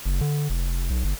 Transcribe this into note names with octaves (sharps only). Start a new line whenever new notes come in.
F#1
D3
F1
B1
G1